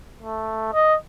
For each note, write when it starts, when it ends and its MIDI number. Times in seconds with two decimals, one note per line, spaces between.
0.21 0.72 57
0.73 0.96 75